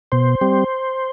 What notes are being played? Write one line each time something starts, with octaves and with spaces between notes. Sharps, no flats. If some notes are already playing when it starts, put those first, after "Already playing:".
B2 C5
G3 C4